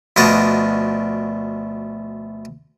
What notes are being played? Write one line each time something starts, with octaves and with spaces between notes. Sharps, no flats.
D2 B2 F3 D4 D#5 A5